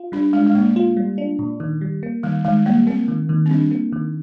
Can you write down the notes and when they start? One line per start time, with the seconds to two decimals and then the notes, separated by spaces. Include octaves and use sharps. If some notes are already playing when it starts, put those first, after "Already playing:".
Already playing: F4
0.12 G3 D4
0.33 G#3 D4
0.46 G#3
0.55 A#2 A#3
0.76 F4
0.97 G3
1.18 D4
1.39 A#2
1.60 D#3
1.81 G3
2.03 A#3
2.23 D#3 G3
2.45 D#3 G#3
2.66 G3 A#3
2.87 A#3 C4
3.08 D#3
3.29 D#3
3.46 C4
3.50 G3 D4
3.71 A#3
3.92 D#3